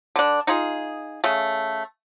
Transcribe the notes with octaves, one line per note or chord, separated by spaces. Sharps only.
D3 D4
D#4 F4 G#4
C#3 A3